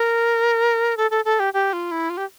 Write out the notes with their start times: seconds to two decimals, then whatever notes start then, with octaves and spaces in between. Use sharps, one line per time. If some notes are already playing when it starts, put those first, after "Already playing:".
Already playing: A#4
0.97 A4
1.11 A4
1.25 A4
1.39 G4
1.53 G4
1.73 F4
1.91 E4
2.10 F4
2.17 G4